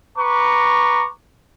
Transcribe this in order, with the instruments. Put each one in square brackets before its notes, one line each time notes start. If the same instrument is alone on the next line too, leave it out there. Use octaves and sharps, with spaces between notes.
[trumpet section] B4 A#5 C#6 D6